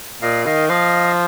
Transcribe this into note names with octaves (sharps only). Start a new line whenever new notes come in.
A#2 D#5 F5
D#3 D#5 F5
F3 D#5 F5